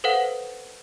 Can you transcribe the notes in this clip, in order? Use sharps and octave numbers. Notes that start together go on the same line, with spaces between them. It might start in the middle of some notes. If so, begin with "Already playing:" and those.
A4 B4 C5 F5 F#5